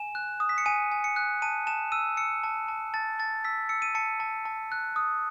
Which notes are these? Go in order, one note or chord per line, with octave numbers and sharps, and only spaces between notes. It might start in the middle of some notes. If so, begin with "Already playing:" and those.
Already playing: G#5 E7
F#6
D#6
B6
C#7
G#5 D#7
G#5
C#7
F#6
A5 D#7
A5 E7
E6 D#7
E6 C#7
A5
A5
A5 A6
A5 A6
E6 B6
E6 C#7
D#7
A5 C#7
A5
A5
F#6
D#6